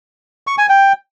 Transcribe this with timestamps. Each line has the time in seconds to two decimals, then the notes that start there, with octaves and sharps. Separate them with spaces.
0.47 C#6
0.58 G#5
0.69 G5